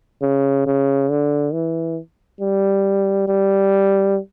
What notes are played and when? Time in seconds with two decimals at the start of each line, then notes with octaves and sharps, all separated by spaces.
0.22 C#3
0.67 C#3
1.10 D3
1.53 E3
2.41 G3
3.28 G3